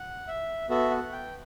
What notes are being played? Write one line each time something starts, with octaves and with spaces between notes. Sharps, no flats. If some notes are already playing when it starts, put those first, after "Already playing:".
Already playing: F#5
E5
B3 F#4 A4 E5
F#5
G5